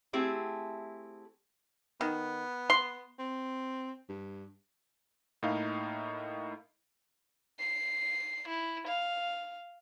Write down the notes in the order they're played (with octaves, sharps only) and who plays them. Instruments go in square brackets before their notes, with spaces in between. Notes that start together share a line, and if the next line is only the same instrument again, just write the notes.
[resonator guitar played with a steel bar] A3 C4 E4 G4 G#4
[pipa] D#3 [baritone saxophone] B3
[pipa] C6
[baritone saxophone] C4
G2
[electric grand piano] A2 A#3 D#4 E4 F5
[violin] C7
E4
F5